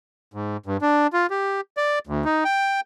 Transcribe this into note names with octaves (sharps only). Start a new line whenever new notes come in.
G#2
G2
D4
F4
G4
D5
D2
D#4
G5